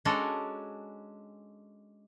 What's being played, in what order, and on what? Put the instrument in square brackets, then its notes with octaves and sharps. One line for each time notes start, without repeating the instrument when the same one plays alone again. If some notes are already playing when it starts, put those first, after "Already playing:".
[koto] G#3 C#4 D4 F#4 A4 A#4